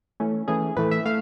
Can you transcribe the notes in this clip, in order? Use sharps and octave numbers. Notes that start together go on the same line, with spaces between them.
E3 A3 C#4
E3 A3 C#4 G#4
A2 E3 A3 B4
E5
A3 F5